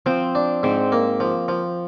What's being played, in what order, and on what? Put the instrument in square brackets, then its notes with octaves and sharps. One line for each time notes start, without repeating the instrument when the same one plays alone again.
[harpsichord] F3 [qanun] C4
[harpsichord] D4
[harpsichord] G#2 [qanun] C4
[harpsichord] A#3
F3
F3